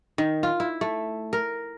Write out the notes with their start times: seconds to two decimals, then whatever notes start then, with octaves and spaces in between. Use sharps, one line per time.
0.18 D#3
0.43 F4
0.60 E4
0.81 A3
1.33 A#4